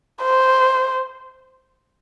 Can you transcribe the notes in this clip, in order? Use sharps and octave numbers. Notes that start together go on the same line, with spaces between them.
C5